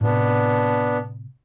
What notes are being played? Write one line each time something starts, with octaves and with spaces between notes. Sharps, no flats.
A2 C3 B3 D4